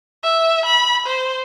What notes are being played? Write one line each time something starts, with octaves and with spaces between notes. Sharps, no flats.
E5
B5
C5